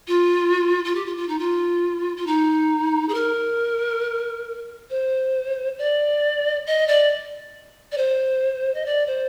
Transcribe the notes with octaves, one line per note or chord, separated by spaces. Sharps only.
F4
F4
G4
F4
F4
D#4
F4
F4
D#4
G#4
A#4
C5
D5
D#5
D5
D5
C5
D#5
D5
C5